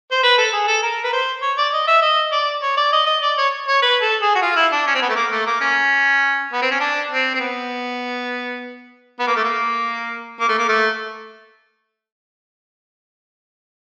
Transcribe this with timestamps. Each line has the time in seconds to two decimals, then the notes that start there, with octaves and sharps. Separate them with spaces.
0.11 C5
0.23 B4
0.38 A4
0.53 G#4
0.68 A4
0.83 A#4
1.04 B4
1.13 C5
1.42 C#5
1.58 D5
1.73 D#5
1.88 E5
2.02 D#5
2.32 D5
2.63 C#5
2.77 D5
2.93 D#5
3.07 D#5
3.22 D5
3.38 C#5
3.68 C#5
3.82 B4
4.01 A4
4.22 G#4
4.35 F#4
4.42 F4
4.56 E4
4.72 D4
4.87 C#4
4.95 C4
5.02 B3
5.09 A3
5.16 A#3
5.31 A3
5.46 A#3
5.61 C#4
6.53 B3
6.62 C4
6.71 C#4
6.80 D4
7.11 C4
7.35 C4
7.40 B3
9.20 B3
9.27 A#3
9.36 A3
9.44 A#3
10.40 A#3
10.49 A3
10.58 A#3
10.69 A3